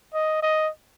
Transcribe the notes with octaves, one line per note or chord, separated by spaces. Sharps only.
D#5
D#5